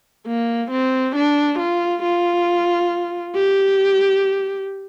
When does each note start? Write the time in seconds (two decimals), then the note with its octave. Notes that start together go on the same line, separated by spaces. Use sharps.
0.27 A#3
0.71 C4
1.16 D4
1.59 F4
2.03 F4
3.36 G4